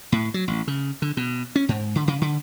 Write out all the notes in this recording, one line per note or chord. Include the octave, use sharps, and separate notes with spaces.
A2
F#3
A1
C#3
D3
B2
C#4
G#2
D3
C#3
D3